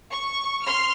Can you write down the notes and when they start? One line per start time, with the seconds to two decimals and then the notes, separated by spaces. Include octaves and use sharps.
0.10 C#6
0.63 C6 F6